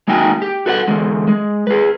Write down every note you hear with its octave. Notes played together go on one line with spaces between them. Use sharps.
G#3 A#3 D#4 F#4 G5 G#5
G4
F#4 A4 B4 D#5 F#5
E2 D3 G#3
G#3
G#4 B4